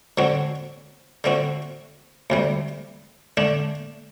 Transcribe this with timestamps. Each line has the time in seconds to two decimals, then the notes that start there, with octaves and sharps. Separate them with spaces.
0.18 D3 F#3 C4 F#4
1.24 D3 A3 C4 F#4
2.30 D2 C3 G3
3.37 D3 A3 D4